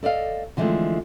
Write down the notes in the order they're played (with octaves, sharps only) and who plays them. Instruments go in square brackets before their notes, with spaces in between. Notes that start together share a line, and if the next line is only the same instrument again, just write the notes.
[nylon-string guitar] A4 D5 D#5 F5
D3 E3 F3 G#3 A3 C4